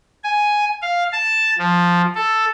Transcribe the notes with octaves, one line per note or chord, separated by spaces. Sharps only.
G#5
F5
A5
F3
A4